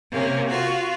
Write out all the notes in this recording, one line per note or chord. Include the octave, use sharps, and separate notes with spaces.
C3 A#3 C#4
F4 F#4